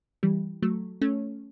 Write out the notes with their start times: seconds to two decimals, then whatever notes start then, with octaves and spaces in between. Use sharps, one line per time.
0.23 E3 G3
0.62 F#3 A3
1.01 A3 C#4